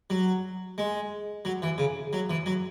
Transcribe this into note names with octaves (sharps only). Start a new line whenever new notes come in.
F#3
G#3
F#3
E3
C#3
F#3
E3
F#3